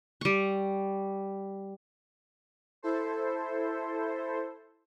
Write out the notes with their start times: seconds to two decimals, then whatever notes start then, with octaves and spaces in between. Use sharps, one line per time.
0.21 G3 C#6
2.83 E4 A4 C5